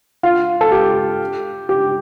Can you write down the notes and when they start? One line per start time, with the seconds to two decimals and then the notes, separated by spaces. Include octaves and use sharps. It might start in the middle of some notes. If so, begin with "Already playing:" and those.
0.23 F4
0.61 A4
0.72 G4
1.69 G4